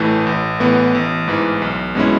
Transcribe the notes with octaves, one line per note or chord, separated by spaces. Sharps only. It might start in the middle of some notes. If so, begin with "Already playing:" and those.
Already playing: A1 A2 E3 A3
A1
A2 E3 B3
A1
G#2 E3
B1
B2 G#3 C#4 E4